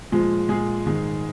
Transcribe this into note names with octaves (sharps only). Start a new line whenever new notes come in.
A#2 F3 G#3
A#2 G#3 G#4
G#2 D#3 G#3